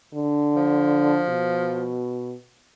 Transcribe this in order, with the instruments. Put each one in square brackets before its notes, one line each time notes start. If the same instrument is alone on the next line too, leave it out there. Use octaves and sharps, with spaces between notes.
[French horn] D3
[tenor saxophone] F3
[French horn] B2